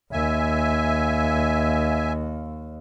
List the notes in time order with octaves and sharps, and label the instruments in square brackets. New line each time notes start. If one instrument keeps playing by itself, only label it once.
[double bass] D#2 [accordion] E5 G#5